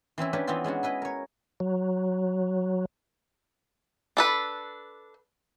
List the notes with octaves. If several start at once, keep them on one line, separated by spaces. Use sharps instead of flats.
E3 C4 C#4 E4
C#4 D4 G4 B4
E3 B3 C4 E4 F4
G#3 C#4 D4 F#4
E4 G#4 B4 D#5
A#4 C#5
F#3
D4 A4 B4